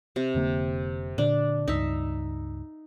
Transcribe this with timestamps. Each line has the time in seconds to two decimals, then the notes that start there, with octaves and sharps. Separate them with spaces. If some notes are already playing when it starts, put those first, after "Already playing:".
0.16 C3
0.35 F1 D3 A#3
1.18 A#2 D3 D4
1.68 C#2 G2 D#4 E5